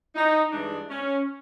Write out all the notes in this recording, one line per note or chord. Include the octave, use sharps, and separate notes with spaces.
D#4
G2 E3 G#3 D4
C#4